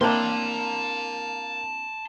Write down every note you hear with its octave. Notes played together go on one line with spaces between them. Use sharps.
A#3 C4 D4 E4 A5 C6